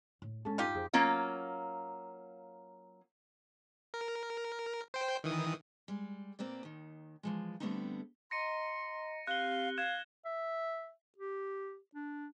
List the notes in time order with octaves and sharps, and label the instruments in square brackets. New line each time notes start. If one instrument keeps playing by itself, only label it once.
[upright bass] A2
[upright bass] G#3 D4 [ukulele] C#4 A4
[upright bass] G2 [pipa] D#4 F4 G4
[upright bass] F2 [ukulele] G#4 C5
[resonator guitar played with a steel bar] F#3 A#3 C#4 F4
[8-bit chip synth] A#4
C5 G5
D#3 E3 D#6
[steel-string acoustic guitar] G3 G#3
A#2 A#3 C4 B4 D5
D#2 D#3
E3 F3 G#3
D3 G3 A3 B3 C4 D#4
[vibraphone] D#5 A#5 [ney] C6 [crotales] A#6 C#7 D#7
[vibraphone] C4 G4 [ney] F5 [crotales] F#6 G7
[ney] F5 [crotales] F#6 G#6 E7
[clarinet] E5
G4
D4